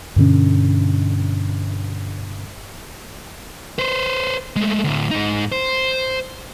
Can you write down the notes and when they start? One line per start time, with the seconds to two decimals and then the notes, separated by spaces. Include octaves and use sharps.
0.16 G2 B2 D3 C#4
3.79 B4 C5
4.56 G#3 A3
4.84 D2 A2
5.11 G#2 D#4
5.52 C5